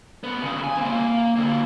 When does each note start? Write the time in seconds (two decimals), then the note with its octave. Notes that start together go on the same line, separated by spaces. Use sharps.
0.24 C#2 B3
0.43 D#2 C#3
0.64 G#5
0.77 A#3 C4
0.95 A#3
1.36 D3 A#3